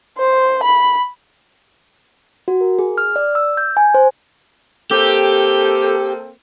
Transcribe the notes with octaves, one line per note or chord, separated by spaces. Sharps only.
C5
B5
F#4
A#4
G#4
F6
D5
E6
G6
G#5
C5
A#3 C4 G4 A4